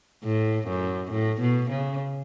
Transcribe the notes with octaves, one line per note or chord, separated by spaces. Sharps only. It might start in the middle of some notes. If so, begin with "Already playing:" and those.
A2
F#2
A2
B2
C#3